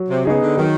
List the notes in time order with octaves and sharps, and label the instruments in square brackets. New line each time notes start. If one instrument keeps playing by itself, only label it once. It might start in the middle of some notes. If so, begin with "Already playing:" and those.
Already playing: [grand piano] F#3
[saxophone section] C3
[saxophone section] C#3 [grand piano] B3 D#4 G#4
[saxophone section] D3
[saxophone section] D#3 [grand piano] F#3